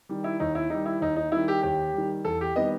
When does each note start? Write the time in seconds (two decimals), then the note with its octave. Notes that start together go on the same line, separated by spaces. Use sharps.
0.09 D#3 G3
0.24 E4
0.40 D#2 D#4
0.55 E4
0.70 D#3 G3 D#4
0.86 E4
1.01 D#2 D#4
1.16 D#4
1.32 D#3 G3 E4
1.48 G4
1.63 D#2 G4
1.94 D#3 G3
2.24 E2 A4
2.41 G4
2.56 D#3 G3 B3 D#5